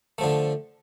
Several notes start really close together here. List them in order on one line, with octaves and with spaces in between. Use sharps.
A3 F3 D3